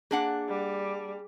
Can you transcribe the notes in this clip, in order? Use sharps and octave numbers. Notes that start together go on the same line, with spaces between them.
A#3 D4 G#4 F#5
G3